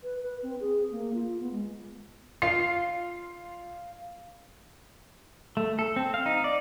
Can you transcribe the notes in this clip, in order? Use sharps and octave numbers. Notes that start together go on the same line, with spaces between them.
B4
B4
C4
G#4
A#3
F4
B3
G#3
F4 F5 C7
A3
A4
C4
F5
D#4
D5